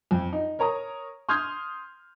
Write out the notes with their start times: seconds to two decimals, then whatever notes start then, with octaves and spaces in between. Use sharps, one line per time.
0.11 F2
0.33 D#4
0.59 A#4 C#5 A#5 D#6
1.29 C6 D#6 F6 G6 G#6